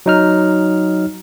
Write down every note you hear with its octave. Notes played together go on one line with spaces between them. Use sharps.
F#3 D#4 F6